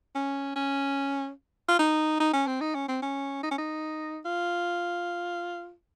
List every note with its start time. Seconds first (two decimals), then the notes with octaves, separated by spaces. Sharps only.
0.15 C#4
0.56 C#4
1.68 F4
1.79 D#4
2.20 D#4
2.34 C#4
2.47 C4
2.61 D#4
2.75 C#4
2.88 C4
3.02 C#4
3.43 D#4
3.51 C#4
3.58 D#4
4.25 F4